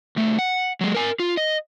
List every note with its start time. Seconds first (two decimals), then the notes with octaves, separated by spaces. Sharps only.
0.16 C2 A3
0.39 F#5
0.81 F#3 G#3
0.95 A#4 G#5
1.19 F4
1.37 D#5